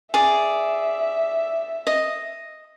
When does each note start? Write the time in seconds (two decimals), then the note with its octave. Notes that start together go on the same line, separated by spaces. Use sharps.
0.14 G#4 D5 E5
1.87 D#5